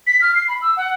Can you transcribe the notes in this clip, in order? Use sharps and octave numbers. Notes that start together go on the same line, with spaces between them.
B6
F6
C7
B5
E6
F#5